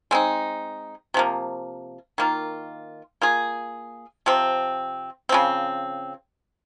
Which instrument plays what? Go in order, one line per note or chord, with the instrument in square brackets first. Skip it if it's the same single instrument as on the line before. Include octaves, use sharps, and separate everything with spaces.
[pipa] G#3 C4 D#4
C3 F3 A#3
D#3 A#3 F4
A#3 F4 G#4
C3 F3 C4
C#3 F3 C4